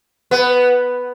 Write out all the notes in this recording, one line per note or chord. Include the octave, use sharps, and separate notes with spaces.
B3